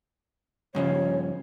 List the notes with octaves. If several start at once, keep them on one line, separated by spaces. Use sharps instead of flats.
G2 C#3 F3 C#5